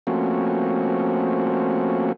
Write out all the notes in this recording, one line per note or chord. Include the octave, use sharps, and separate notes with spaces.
F3 A3 A#3 C4 C#4 F#4